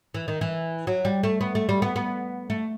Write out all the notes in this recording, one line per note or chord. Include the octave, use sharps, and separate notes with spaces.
E3
D#3
E3
F#3
G3
A3
B3
A3
G3
B3
B3
A3